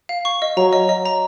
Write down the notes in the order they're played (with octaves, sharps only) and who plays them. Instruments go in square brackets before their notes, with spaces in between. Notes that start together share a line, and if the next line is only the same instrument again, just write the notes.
[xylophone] F5
C#6
D#5
[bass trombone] F#3 [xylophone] A#5
[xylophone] D#5
D#5
A#5